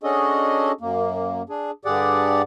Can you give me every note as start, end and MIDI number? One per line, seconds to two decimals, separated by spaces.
0.03 0.72 61
0.03 0.72 62
0.03 0.72 66
0.03 0.72 68
0.03 0.72 69
0.03 0.72 75
0.81 1.42 42
0.81 1.42 58
1.49 1.71 62
1.49 1.71 68
1.85 2.42 43
1.85 2.42 50
1.85 2.42 67
1.85 2.42 68
1.85 2.42 74
1.85 2.42 78